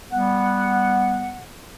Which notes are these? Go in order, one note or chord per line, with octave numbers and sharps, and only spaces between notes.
G3 B3 F#5